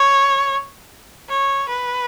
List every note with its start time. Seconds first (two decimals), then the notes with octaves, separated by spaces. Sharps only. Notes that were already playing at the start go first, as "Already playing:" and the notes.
Already playing: C#5
1.29 C#5
1.69 B4